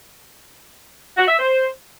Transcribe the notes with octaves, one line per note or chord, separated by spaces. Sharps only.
F#4
E5
C5